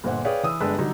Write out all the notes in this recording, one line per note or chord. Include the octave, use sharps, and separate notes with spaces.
G1 A#2 C5 F#5
G#4 B4 C#5 D5 F5 G5
E3 D#6 E6
G1 G#3 D4 B4 G5 E6
D3 F#3 G3 D#4